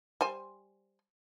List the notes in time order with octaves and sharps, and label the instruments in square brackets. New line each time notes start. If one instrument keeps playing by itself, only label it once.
[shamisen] G3 C5 G#5